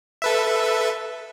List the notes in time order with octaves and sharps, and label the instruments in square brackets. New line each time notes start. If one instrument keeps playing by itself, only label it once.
[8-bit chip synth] A4 B4 E5